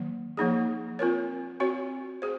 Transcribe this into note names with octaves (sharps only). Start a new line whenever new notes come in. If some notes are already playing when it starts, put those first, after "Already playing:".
Already playing: D#3 F#3 A#3
F3 A#3 D#4 G#4
C4 F4 A#4 C#5
C4 F#4 C#5
G#4 C5